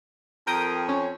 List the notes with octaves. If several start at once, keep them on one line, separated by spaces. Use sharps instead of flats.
F2 A#4 G5 D#6
C#4